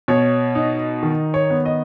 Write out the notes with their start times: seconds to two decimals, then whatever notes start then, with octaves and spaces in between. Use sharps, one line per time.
0.08 B2 C#5
0.55 D#4
1.03 D#3
1.34 C#5
1.50 B3
1.65 D#5